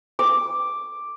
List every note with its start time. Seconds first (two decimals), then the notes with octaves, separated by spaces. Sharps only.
0.19 D6